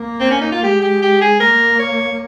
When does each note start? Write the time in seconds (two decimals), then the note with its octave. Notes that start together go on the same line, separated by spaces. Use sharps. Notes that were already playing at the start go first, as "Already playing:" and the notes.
Already playing: A#3
0.20 C4
0.30 C#4
0.41 D#4
0.52 F4
0.63 G#3 G4
0.82 G4
1.02 G4
1.21 G#4
1.40 A#3 A#4
1.79 C#5